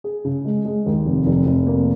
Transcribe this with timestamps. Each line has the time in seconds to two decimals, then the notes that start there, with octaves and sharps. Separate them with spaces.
0.04 G#4
0.25 C#3
0.45 G#3
0.65 G#3
0.86 D#2
1.05 F1
1.26 F1
1.46 F1
1.67 A#3